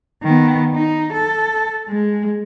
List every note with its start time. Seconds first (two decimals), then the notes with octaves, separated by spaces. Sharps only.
0.23 D#3 B3
0.75 D#4
1.13 A4
1.89 G#3